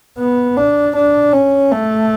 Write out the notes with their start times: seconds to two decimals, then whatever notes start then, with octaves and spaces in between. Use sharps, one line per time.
0.18 B3
0.57 D4
0.95 D4
1.33 C#4
1.71 A3